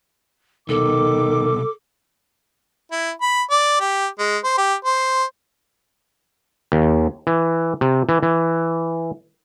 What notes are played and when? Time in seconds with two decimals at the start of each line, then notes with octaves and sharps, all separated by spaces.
0.69 C2 B2 D#3 A4 D6
2.92 E4
3.22 B5
3.51 D5
3.81 G4
4.19 G#3
4.44 C5
4.58 G4
4.85 C5
6.72 D#2
7.27 E3
7.81 C3
8.09 E3
8.23 E3